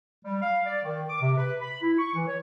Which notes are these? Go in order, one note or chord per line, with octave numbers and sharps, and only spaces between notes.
G3
F5
D5
D#3
D6
C3
B4
B5
E4
C#6
E3
C#5